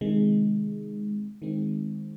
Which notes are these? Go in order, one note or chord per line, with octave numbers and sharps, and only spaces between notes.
C3 D#3 G#3
D#3 G#3 C4